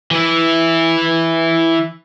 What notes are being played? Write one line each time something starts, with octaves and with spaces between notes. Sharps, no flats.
E3 E4